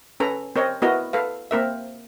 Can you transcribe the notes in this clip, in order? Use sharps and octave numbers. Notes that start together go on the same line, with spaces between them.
C#4 A4 B4 A#5
C4 A#4 C#5 D#5
B3 E4 F#4 A#4 D#5
A4 B4 F5
A#3 C4 A#4 E5